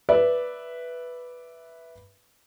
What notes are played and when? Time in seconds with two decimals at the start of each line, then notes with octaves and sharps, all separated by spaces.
0.09 B4 D5 E5